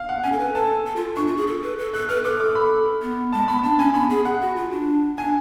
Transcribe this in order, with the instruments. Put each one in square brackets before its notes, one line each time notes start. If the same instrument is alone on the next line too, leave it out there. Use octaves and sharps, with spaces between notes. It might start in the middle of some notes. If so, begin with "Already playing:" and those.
Already playing: [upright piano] F5
F#5
[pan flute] C#4 [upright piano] G#5
[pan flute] A4
B4
[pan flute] A4 [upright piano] A5
[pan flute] A4
F4
[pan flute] D4 [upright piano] C#6
[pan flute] F4
G#4
A4
B4
A4
[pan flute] A4 [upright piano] F#6
[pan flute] B4 [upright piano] F6
[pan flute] A4 [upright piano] D6
[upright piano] D6
B5
[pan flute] B3
[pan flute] G#3 [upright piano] A5
[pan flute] B3 [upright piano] B5
[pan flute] D4 [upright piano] A5
[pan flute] C#4 [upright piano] G#5
[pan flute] B3 [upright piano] B5
[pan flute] G#4
[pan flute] G#4 [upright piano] F#5
[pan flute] F#4
F4
D4
[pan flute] D4 [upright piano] G#5